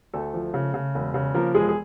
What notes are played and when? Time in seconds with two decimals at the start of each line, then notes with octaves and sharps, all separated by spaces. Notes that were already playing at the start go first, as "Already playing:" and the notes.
0.13 D2 A3 A4
0.34 F3
0.54 C#3
0.74 C#3
0.95 E1
1.14 C#3
1.34 F3 A#3 A#4
1.54 E1 G#3 G#4
1.69 G#4